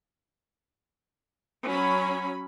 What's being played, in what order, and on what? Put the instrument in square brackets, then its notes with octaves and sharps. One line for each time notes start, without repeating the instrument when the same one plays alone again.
[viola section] F#3 C#4 B5